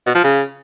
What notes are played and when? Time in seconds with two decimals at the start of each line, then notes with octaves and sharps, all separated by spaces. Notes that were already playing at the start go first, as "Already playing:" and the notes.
0.06 B2
0.15 F3
0.23 C#3